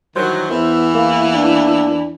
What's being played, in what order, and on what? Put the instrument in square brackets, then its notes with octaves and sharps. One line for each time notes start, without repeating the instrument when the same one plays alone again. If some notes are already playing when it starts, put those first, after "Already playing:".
[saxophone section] G2 E3 F#3 [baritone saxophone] D#3 [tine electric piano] C5
[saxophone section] E2 E5 [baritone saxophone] E3 [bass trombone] B3
[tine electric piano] A#3 [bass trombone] E4
[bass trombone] D4